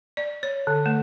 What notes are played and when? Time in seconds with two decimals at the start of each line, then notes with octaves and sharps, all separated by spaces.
0.17 D5
0.43 C#5
0.67 D3
0.86 A3